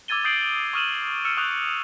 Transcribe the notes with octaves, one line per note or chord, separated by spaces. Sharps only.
D6 E6 G#6 A6 D#7 G7
D#6 G6 A6 C7 D7 F#7
C#6 D#6 F6 D#7 E7 F#7
E6 F6 C#7 D#7 E7
C#6 D#6 F#6 G6 F7